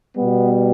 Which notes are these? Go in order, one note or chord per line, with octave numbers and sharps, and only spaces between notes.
B2 G3 B3